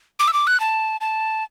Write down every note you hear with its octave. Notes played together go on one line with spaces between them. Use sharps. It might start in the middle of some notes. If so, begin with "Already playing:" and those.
D6
E6
D6
F#6
A5
A5